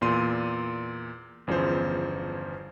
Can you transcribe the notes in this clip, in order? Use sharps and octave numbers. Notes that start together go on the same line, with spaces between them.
E2 A#2 C6 D#7
G1 E2 C#3 F3 C5